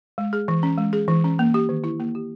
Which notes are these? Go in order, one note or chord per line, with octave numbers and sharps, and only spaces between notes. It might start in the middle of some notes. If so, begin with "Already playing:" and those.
G#3
G#4
E3
C#4
G#3
G#4
E3
C#4
A#3
G4
D#3
E4
A#3
G4